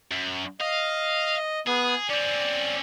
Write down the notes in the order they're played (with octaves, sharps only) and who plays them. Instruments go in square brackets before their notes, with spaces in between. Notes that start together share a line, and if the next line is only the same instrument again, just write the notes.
[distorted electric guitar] F#2
[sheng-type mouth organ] D#5 [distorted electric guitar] F5
[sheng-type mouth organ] B3 [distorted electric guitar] G#4
[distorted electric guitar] C4 C#4 [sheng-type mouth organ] D5